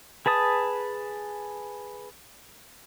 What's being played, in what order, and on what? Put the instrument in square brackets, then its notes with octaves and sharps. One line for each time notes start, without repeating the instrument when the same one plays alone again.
[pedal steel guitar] G#4 B4 A5 D#6